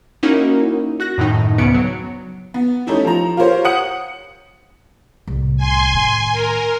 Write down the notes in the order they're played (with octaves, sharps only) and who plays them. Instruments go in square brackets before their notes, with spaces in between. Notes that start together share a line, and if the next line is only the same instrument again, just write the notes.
[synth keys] A#3 C#4 D#4 E4 F#4 A#4
F#4 F#6 A#6
F#2 A2 D#3 D#4
D2 C#3 B3 C#7 D7
F#3
[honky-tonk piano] B3
A3 C#4 D#4 E4 G4
F3 A#5
F4 G4 A#4 C5 C#5
F#5 D#6 C#7 F#7
[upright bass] C2 A2
[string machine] G#5 C6
[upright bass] A2 D#3
[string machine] A#4